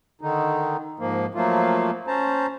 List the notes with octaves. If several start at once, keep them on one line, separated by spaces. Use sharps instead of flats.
D3 D#3 D#4
G#2 F3 A#3
F3 F#3 A3 A#3 F4
C#4 C5 A5 A#5